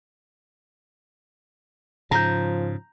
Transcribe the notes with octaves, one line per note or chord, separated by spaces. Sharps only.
G#2 C#3 F3 A#5 G6